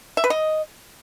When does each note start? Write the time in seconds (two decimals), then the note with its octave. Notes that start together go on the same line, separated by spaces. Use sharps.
0.17 E5
0.24 B4
0.30 D#5